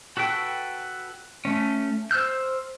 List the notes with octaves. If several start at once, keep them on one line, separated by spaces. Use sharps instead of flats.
F#4 A4 B4 G5
A3 C#4
C5 E6 F6 G6